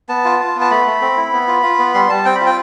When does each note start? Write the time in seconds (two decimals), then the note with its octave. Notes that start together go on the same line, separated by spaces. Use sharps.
0.09 B3 A5
0.25 F4
0.40 F4
0.55 B3
0.61 A5
0.70 A3 B5
0.86 A3
1.02 C4
1.17 E4
1.33 B3
1.48 F4
1.63 F4
1.79 B3
1.94 G3 C6
2.09 G3 A5
2.25 C4 G5
2.35 B5
2.41 F4
2.46 G5